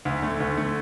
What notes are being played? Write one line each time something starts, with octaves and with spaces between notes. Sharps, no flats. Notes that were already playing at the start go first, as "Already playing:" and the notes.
D2
D3 A3
D2
D3 A3